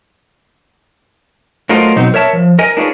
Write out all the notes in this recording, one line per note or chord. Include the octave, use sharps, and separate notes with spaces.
F#3 A3 F4 A#4 C5 D#5
B2 F#3 C4 D#4
A#4 C#5 E5 A5
F3
A#4 D#5 G#5
D4 D#4 F4 G#4 B4 C#5